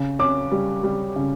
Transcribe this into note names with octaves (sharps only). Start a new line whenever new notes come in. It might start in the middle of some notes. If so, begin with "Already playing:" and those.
Already playing: C#3
C#4 D6
G3
G3
C#3